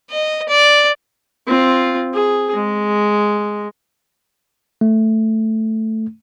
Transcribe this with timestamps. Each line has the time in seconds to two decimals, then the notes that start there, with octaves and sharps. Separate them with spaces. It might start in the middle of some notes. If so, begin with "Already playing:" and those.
0.10 D#5
0.49 D5
1.47 C4 F4
2.14 G#4
2.54 G#3
4.81 A3